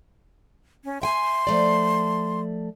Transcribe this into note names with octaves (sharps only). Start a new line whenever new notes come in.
C#4
E5 G5 G#5 C6
F3 A3 D5